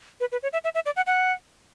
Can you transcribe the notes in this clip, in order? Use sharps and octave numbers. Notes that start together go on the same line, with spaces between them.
B4
B4
C#5
E5
E5
E5
D5
F#5
F#5